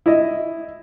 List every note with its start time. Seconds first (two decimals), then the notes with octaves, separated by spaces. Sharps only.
0.06 E4 D#5